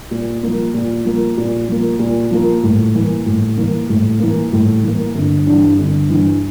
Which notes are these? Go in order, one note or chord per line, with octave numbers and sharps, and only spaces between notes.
A#2
F3 A#3
A#2
F3 A#3
A#2
F3 A#3
A#2
F3 A#3
A2
E3 A#3
A2
E3 A#3
A2
E3 A#3
A2
E3 A#3
G1
G2 E3
G1
G2 E3